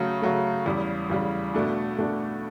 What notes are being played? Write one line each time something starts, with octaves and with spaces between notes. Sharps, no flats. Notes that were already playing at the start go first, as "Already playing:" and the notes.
Already playing: C#3 F#3 A3
C#3 F#3 A3
E2 C#3 G3
E2 C#3 G3
B2 A3 D4
B2 A3 D4